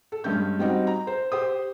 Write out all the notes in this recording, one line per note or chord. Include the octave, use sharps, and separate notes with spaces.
A4
G2 G#3 C#4 G6
G3 C4 D#4 F#4
A#5
C5
G4 C5 D#6